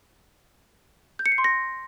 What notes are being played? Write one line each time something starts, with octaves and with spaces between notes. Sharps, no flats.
G6
C#7
C7
C6
A#6